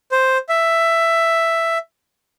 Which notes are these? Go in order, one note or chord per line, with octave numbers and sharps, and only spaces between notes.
C5
E5